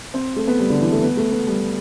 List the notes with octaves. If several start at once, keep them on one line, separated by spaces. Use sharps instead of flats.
C4
A3
B3
G3
D3
E3
A3
B3
A3
B3
G3